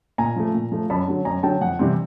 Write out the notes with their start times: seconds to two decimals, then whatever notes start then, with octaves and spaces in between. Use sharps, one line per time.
0.18 A#2 G#5 A#5
0.36 F3 A3
0.54 A#2
0.72 F3 A3
0.90 F#2 A5 B5
1.08 D3 F#3
1.25 F#2 G#5 A#5
1.43 D3 F#3 G5 A5
1.61 F2 F#5 G#5
1.79 C3 E3 G3 C4